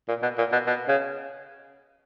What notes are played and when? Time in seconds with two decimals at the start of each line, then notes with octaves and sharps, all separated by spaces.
0.08 A#2
0.23 B2
0.38 A#2
0.52 B2
0.67 B2
0.89 C#3